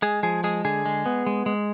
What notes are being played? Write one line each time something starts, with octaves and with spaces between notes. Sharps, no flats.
G#3 G#4
F3 G#4
G#3 G#4
D3 G#4
G#3
B3
G#3
G#3